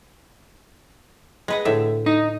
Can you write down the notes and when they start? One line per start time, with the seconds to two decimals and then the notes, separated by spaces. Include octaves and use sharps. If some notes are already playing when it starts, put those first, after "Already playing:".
1.48 G#3 B4 F#5
1.65 A2 D3 E5
2.06 D#4